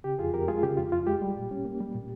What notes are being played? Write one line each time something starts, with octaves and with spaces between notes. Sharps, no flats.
C#3 G4
F2 F4 G#4
F2 G4 A#4
G#3 F4 G#4
C#3 G4
F2 F4
F2 F4
G#3 G4
G3
A#2
C#4
A#3
G3
A#2